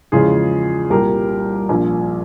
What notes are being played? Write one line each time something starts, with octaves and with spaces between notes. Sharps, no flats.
E2 C#3 F3 G#3 F4 G#4
C2 A#2 G3 G4 A#4
A#1 A#2 F3